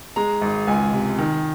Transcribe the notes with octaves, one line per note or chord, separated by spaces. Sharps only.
G#3 A#5
G#1
C#2 G#5
C3
D#3